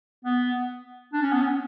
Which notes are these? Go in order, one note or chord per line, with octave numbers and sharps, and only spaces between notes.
B3
D4
C#4
B3
C#4